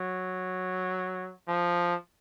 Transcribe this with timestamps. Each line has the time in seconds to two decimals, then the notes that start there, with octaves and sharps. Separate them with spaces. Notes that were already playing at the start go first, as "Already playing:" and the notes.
Already playing: F#3
1.48 F3